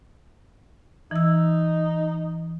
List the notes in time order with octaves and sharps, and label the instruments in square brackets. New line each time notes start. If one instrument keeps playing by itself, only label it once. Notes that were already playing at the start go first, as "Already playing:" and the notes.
[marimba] E3 E6 [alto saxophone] D#4